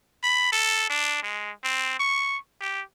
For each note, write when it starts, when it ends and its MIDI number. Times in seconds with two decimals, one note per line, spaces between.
0.23 0.51 83
0.52 0.86 69
0.90 1.21 62
1.22 1.51 56
1.64 1.99 60
2.00 2.37 85
2.61 2.81 67